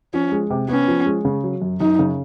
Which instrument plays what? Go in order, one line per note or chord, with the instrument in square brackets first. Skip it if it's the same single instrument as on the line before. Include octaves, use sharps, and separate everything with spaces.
[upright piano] F3 [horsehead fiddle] C#4
[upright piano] G#3
C3
[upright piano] B3 [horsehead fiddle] C#4
[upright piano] F3
G#3
C#3
F#3
F#2
[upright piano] F#2 [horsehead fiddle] D#4
[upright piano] C#3